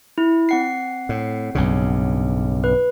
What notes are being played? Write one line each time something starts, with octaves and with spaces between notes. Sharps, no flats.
E4
C4 F#5 C7
A2
B1 G2 C#3
B4